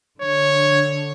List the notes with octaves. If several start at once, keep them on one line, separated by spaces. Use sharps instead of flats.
D3 C#5